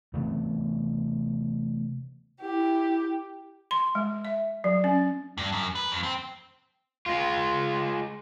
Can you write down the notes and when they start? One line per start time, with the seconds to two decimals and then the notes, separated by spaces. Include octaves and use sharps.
0.13 C3 E3 A3 B3
2.41 E4 G4
3.71 C6
3.95 G#3
4.25 E5
4.64 F#3
4.84 C#4
5.38 G2
5.52 F#2
5.75 B4
5.91 F2
6.03 C4
7.06 G#3 F4